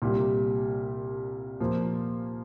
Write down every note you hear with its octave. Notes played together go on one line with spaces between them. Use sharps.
C2 A#2 G3
A#2 F3 A#3